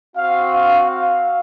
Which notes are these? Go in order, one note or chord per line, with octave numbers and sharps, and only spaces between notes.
C4 F#4 F5
F5
F5